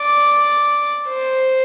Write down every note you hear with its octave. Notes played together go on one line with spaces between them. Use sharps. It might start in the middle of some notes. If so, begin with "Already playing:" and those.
Already playing: D5
C5